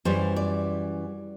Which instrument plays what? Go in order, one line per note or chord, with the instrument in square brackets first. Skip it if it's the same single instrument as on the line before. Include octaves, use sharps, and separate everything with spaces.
[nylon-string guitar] F#2 E3 G3 C5
D5